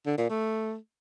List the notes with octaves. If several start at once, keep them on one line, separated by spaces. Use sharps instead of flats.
D3
A#2
A3